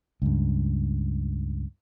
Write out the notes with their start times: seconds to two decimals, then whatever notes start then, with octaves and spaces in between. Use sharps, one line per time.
0.22 C#2 G2